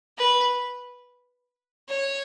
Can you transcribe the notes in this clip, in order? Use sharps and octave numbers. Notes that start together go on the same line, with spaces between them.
B4
C#5